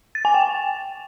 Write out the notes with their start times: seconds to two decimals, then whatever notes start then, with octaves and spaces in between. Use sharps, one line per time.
0.15 A6
0.25 G#5
0.34 G5